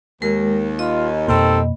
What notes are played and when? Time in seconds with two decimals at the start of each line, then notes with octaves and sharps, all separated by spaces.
0.22 D#2 G#3 A#4
0.79 F4 D#5 B5
1.28 F2 B2 D#3 G3 A#3 C4 A4